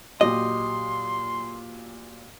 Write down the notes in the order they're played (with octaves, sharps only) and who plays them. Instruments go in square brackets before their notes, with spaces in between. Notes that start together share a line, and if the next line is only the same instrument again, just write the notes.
[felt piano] A#2 F#3 G4 [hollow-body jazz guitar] D#5 [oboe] C6